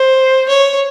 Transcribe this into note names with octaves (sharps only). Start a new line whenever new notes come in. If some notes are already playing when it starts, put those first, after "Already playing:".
Already playing: C5
C#5